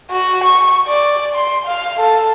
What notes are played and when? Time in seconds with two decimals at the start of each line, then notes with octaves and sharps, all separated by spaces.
0.11 F#4
0.44 C#6
0.88 D5
1.35 C6
1.66 F5
2.00 A4